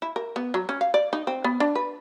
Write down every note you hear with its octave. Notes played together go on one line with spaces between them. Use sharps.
E4
A#4
B3
F#3
C#4
F5
D5
D#4
C4
B3
D4
B4